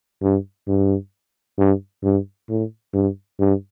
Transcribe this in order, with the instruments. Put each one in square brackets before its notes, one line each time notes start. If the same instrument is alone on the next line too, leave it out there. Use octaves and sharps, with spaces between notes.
[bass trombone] G2
G2
G2
G2
A2
G2
G2